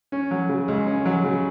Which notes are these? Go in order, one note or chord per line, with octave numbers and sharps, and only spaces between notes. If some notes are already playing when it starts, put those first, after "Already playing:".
C#4
F#3
C#3
C#2
C#4
F#3
C#3